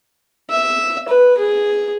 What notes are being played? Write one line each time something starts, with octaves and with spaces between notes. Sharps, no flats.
E5
B4
G#4